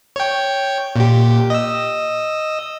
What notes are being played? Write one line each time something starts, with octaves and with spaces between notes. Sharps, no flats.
C#5 G5
A#2 G4
D#5 E6